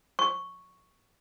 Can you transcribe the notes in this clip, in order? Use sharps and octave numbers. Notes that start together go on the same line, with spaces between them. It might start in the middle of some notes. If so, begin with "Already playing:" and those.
C#6